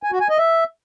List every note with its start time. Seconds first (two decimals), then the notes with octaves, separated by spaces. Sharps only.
0.03 G#5
0.12 F#4
0.21 G#5
0.29 D#5
0.38 E5